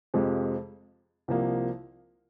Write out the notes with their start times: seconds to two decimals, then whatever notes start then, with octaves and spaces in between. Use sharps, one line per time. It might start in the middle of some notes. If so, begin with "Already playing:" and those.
0.14 F2 C3 F3 G#3
1.28 C2 C3 F3 A#3